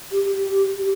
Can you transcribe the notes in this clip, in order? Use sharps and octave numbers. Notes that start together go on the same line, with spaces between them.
G4